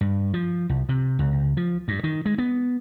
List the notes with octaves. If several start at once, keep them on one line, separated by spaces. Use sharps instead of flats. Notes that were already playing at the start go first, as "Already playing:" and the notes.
G2
F3
C2
C3
C#2
F3
G2
D#3
G#3
B3